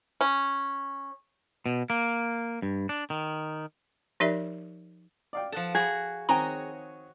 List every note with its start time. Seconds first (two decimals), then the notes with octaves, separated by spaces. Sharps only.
0.21 C#4
1.66 B2
1.90 A#3
2.62 G2
2.89 D4
3.10 D#3
4.20 F3 D#4 G4 A#4 D5 E5
5.33 D5 F5 G5
5.52 F3 A4 F#5 A5
5.75 F#4 G#4 B5
6.29 D#3 C4 F#4 C#5 D#5 G5 G#5 A#5